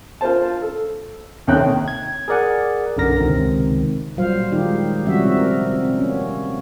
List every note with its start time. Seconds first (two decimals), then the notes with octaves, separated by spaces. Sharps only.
0.21 F4 A#4 C5 A5
0.62 A4
1.47 D#2 C3 D#3 C#4 G5 F#6
1.88 G#6
2.28 G#4 A#4 D5 F#5 G#5
2.97 B1 F#2 D3 A#4 A#6
3.20 C#2 C3 D#3 C4
4.17 A#2 F#3 G3 F4 C5 F5
4.52 D#3 G#3 D#4 G4
5.06 C3 F3 G3 C#4 F#4 E5
5.37 A#4
5.65 C3 C4
5.97 A#3 B3 C#4